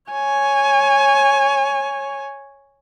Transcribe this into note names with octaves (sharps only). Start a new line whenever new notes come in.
C#5 G#5